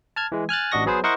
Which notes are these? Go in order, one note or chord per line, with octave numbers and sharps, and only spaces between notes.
A5 F6 G#6
E3 G#3
G#5 F6 F#6 A6
A1 D4 F#4 D#5 C#6 A#6
F#3 B3 G#4 B4 C5
E4 A#4 C5 D#5 F#5 C#6